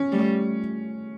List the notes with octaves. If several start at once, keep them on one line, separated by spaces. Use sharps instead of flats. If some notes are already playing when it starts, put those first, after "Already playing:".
Already playing: C#4
G3 A3